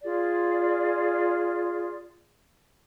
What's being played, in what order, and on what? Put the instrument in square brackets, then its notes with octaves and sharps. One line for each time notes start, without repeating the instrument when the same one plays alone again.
[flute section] F4 G#4 D5